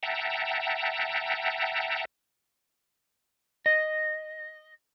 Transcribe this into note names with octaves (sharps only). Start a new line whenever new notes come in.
E5 F#5 G5 A5 A#5
D#5